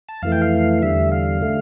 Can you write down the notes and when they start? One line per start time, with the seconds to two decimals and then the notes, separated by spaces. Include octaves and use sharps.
0.09 A5
0.22 F2 E3 A3 F5
0.32 G5
0.42 F5
0.82 E2 D3 G3 E5
1.12 F5
1.42 D3 A3